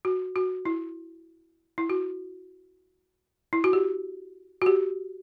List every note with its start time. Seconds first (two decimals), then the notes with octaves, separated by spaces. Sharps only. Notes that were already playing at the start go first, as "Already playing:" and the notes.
0.05 F#4
0.36 F#4
0.65 E4
1.78 E4
1.90 F#4
3.53 E4
3.64 F#4
3.73 G4
4.62 F#4
4.66 G4